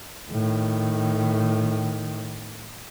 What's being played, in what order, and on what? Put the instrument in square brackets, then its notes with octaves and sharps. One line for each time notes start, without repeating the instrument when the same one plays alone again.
[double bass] A2 D#3